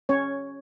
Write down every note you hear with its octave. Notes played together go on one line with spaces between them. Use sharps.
C#4 C#5